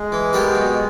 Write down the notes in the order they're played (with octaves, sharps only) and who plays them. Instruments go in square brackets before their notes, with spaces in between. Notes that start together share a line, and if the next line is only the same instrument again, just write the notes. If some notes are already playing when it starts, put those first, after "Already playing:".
Already playing: [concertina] G#3
[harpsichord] E3
G3 B3 G4 A#4
B2